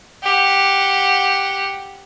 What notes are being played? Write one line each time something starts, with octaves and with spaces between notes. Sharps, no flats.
G4 F#5